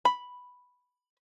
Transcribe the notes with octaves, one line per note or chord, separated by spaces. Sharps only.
B5